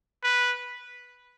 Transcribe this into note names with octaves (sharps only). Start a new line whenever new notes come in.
B4